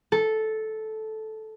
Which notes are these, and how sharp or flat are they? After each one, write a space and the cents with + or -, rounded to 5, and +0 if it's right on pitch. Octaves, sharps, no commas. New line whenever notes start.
A4 -10